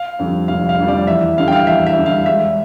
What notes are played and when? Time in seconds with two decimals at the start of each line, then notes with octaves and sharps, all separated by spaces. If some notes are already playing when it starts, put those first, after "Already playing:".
Already playing: F5
0.19 F2 D3 G3
0.48 F1 F5
0.69 F5
0.79 F2 D3 G3
0.88 D5
1.07 E2 E5
1.37 D3 G3 F5
1.48 G5
1.52 F5
1.67 E2 E5
1.87 E5
1.97 D3 G3
2.06 F5
2.26 E1 E5